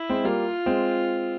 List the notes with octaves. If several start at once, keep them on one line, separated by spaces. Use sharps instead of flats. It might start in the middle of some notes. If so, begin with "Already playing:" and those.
Already playing: E4
G#3 C4
G3 A#3 F4
G#3 C4